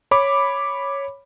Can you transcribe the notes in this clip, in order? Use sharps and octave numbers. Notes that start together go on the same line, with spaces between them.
C#5 B5 D6